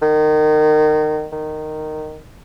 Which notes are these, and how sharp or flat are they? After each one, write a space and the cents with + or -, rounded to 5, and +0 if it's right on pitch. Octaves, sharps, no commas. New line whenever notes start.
D#3 -25
D#3 -10